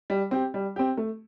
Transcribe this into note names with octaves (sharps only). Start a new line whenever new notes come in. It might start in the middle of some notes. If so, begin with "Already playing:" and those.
G3
C4 G4
G3
C4 G4
A3